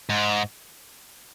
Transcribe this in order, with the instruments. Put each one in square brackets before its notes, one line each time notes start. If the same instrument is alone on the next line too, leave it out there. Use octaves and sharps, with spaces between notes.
[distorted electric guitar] G#2